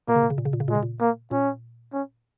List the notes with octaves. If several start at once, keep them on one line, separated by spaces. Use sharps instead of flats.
A#2 A#3
C#3
A#2
C#3
A#2
C#3
A#2
C#3
A#2 G#3
C#3
A#2
A#3
A#2 C#4
C#4